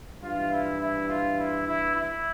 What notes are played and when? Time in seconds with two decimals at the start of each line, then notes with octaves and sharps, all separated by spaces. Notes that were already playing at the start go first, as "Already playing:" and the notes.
0.23 G2 E3 F4
0.52 E4
0.80 E4
1.09 F4
1.38 E4
1.67 E4
1.95 E4